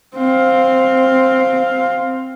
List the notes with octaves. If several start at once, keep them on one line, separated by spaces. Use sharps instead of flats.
C4 F5